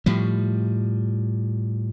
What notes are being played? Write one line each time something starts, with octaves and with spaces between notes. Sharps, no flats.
A2 F3 G3